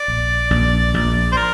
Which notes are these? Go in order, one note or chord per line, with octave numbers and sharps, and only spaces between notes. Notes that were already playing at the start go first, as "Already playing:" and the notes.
Already playing: D5
A#1
A#1
A#1
C5
A#4